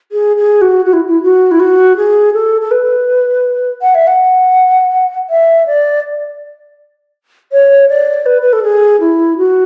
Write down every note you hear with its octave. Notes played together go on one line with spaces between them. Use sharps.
G#4
G#4
F#4
F#4
E4
E4
F#4
E4
F#4
G#4
A4
A4
B4
F#5
E5
F#5
E5
D5
C#5
D5
B4
B4
A4
G#4
E4
F#4